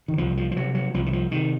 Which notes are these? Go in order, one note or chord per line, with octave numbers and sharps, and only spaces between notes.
D#3
C2 F3
F3
F3
C3 F#3
F#3
C2 F3
D#3
F3
C3 D#3